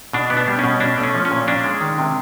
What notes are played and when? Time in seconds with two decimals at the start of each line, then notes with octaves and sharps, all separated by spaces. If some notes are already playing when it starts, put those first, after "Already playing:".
0.13 B2 D4
0.30 B3
0.37 D4
0.48 G3
0.59 B2 C#4
0.80 C#4 D4
0.98 A3
1.03 C#4
1.15 F3
1.25 C#4
1.31 A#2
1.48 C#4 D4
1.64 G#3
1.81 D#3
1.98 C3